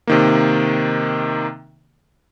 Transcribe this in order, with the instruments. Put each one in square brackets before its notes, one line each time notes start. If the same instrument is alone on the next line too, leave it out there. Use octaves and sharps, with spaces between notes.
[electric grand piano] C3 D#3 A#3